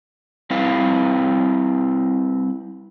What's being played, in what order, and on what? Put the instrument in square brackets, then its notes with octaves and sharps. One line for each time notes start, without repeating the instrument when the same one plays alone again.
[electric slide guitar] G3 C4 E4 B4 F5